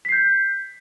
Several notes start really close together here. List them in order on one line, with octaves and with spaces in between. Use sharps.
B6 C7 G6